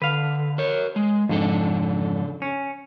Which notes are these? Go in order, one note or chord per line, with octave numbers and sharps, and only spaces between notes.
D3 B4 F5
A#4 C#5
G#3
F2 G#2 C#3 D4 A4
C#4